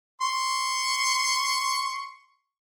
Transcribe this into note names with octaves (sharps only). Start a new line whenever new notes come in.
C6 C#6